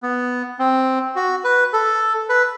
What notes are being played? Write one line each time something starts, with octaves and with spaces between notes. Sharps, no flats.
B3
C4
F#4
B4
A4
B4